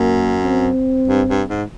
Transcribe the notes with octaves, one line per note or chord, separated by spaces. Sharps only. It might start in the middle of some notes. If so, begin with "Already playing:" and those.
Already playing: F#2 A#3
C4
G2
G2
G#2